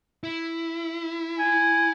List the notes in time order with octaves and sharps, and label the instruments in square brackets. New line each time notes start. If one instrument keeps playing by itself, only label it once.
[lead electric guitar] E4
[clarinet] G#5